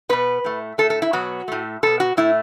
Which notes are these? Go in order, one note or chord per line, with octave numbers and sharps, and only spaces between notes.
B2 B3 B4
A2 A3
A2 A3 A4
A4
E4
B2 F#3 B3 F#4
A2 A3
B2 B3 A4
F#4
A2 A3 E4